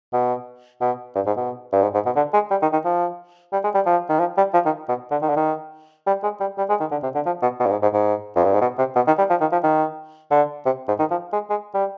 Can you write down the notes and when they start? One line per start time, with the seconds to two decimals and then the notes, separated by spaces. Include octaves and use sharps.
0.13 B2
0.81 B2
1.15 G2
1.26 G#2
1.37 B2
1.73 G2
1.82 G#2
1.94 G#2
2.06 B2
2.16 D3
2.34 G#3
2.51 G3
2.62 D#3
2.73 D#3
2.85 F3
3.53 G3
3.64 G#3
3.74 G3
3.86 F3
4.09 D#3
4.20 F3
4.37 G3
4.54 F3
4.66 D#3
4.89 B2
5.11 D3
5.22 D#3
5.29 D3
5.36 D#3
6.07 G3
6.23 G#3
6.40 G3
6.58 G3
6.69 G#3
6.80 D#3
6.91 D3
7.03 C3
7.15 D3
7.26 F3
7.42 B2
7.60 B2
7.66 G2
7.71 G#2
7.82 G#2
7.93 G#2
8.36 F2
8.45 G2
8.53 G#2
8.61 B2
8.78 C3
8.96 B2
9.07 D#3
9.18 G3
9.30 F3
9.41 D#3
9.52 F3
9.64 D#3
10.31 D3
10.66 C3
10.88 G#2
10.99 D#3
11.11 F3
11.33 G#3
11.50 G#3
11.74 G3